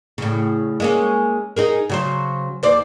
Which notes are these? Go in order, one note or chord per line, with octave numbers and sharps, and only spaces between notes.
A2 C#3
G#3 A#3 C#4
D#4 G#4 A#4
C#3 F#3 C5
D#2 C5 D5